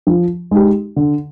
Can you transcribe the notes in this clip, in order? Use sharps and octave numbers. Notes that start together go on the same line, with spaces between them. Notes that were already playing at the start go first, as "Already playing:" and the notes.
F3
G#3 D#4 G4
D3